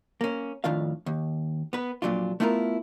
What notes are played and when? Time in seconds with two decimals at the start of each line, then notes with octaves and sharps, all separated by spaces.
0.21 A#3 C#4
0.64 F2 A2 D#3 D4 F4 F5
1.06 D#2
1.73 B3 B4
2.02 F2 A#2 F#3 D4 F4
2.40 A3 B3 E4 F4 G#4 A#4